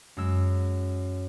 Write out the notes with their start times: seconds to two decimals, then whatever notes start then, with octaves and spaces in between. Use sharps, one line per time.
0.17 F#2 G#3 E6